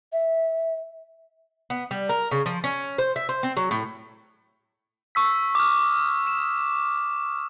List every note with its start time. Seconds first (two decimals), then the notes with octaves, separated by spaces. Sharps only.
0.13 E5
1.70 B3
1.91 G3
2.09 A#4
2.31 C#3
2.46 F3
2.64 C#4
2.98 C5
3.16 E5
3.29 C5
3.43 C4
3.57 F#3
3.71 A2
5.15 C#6 E6 B6
5.55 D6 D#6 F6
6.27 E7